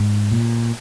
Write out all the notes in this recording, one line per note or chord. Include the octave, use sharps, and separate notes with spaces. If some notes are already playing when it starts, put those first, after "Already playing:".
Already playing: G#2
A#2